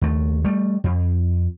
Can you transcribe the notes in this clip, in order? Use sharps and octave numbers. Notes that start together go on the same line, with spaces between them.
D#2 A3
G3 A3
F2